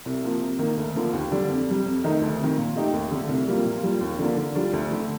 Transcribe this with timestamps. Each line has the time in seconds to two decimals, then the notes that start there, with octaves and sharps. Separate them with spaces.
0.06 C2
0.23 C3 F3 A#3
0.42 C3
0.59 D#3 A#3
0.77 D2
0.95 D3 F3 A#3
1.13 D#2
1.32 D3 G3 D4
1.50 F2
1.67 C3 G3
1.85 F2
2.04 D#3 A3 D#4
2.21 D2
2.40 C3 D#3
2.58 A#2
2.75 A3 D#4 G4
2.93 D#2
3.12 D3 A3
3.29 C2
3.47 C3 G3 A#3 F4
3.65 A#2
3.83 G3 A#3 F4
4.01 D#2
4.19 D3 F3 A#3 D4
4.37 D3
4.55 G3 D4 F4
4.73 D2
4.91 D3 A3